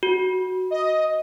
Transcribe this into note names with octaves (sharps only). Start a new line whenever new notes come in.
F#4
D#5